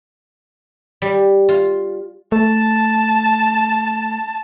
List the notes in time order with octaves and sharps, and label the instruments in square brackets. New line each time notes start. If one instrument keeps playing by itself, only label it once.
[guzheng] G3
F4
[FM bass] A3 [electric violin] A5